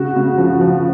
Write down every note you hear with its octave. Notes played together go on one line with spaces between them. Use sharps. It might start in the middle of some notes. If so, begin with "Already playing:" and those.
Already playing: C#3 F#4
C#3
F3
F3